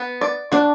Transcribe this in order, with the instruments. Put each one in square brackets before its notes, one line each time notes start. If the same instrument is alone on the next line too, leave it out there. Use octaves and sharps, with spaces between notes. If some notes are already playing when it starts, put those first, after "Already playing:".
Already playing: [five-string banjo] B3
D5
[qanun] D4 [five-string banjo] F#4